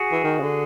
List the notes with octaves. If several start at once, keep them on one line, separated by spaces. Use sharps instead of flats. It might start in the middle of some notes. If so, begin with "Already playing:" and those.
Already playing: F#4 G#4
E3
D#3
C#3
D3